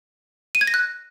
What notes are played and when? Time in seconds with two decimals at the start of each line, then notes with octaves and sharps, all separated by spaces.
0.55 D#7
0.61 G#6
0.67 A#6
0.74 F#6